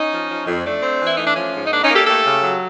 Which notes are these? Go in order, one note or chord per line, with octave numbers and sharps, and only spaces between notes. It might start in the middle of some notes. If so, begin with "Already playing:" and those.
Already playing: C#4 D#4
F3
F3
F2
A3 D4
C4
E3
E4
A3 D#4
D4
F3 C#4
G#2
D#4
A#3 D4
C#4 D#4
A#3
G4 A4
A3 G4 A4
C#3
F#3